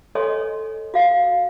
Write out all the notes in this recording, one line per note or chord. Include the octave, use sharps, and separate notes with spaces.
A4 C#5 D#5 G#5 C6
F#4 F5